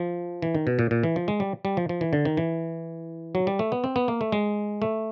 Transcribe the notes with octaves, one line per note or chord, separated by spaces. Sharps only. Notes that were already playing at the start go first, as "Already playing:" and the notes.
Already playing: F3
E3
D#3
B2
A#2
A#2
E3
F3
G#3
G3
G3
F3
F3
E3
D3
D#3
E3
F#3
G3
A3
B3
C4
B3
A#3
A3
G#3
A3